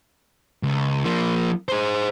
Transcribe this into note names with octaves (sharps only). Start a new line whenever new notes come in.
C#2
F3 A#3
G#4 C5